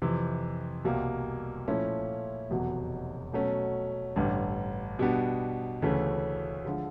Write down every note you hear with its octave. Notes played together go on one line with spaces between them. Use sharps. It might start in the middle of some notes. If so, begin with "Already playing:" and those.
F2 C3 E3
C2 B2 G3 A#3
A#2 F3 A3 C#4 E4
F1 E2 B2 F#3
B2 F#3 A3 C#4
A1 G2 D3
B2 G3 B3 D4
D2 C#3 E3 A3 C#4
D3 F3 G#3